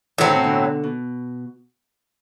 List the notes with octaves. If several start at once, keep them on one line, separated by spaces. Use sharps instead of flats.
A2 E3 F#3 C4
D3
C3
B2 D3
B2